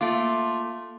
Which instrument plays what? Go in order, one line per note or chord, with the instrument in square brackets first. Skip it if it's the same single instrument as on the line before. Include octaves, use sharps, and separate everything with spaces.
[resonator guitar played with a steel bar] A3 F4 [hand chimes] A#3 D6